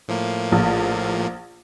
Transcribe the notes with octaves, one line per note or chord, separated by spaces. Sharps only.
A2 F3 A#3
A#1